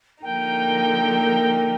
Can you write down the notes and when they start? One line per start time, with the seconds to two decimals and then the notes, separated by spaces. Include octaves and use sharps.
0.23 D3 F3 A#3 D#4 A#4 G5